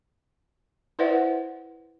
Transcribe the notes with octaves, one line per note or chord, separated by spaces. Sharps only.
E4 B4 C5 D5 E5 F#5